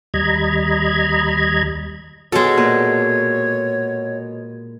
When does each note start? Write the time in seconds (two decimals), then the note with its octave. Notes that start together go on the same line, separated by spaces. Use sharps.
0.14 D#2 G3 D#5 A#5 B5 G#6
2.32 B2 G#3 A4 C#5
2.58 A#2 B4